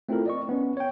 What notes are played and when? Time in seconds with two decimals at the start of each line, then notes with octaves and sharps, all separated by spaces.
0.09 A3 C4 E4 F4 A4 A#4
0.26 D5 D#5 C#6
0.49 B3 C#4
0.77 C#5 G5